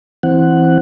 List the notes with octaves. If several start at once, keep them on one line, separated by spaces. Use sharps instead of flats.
E3 C4 F#5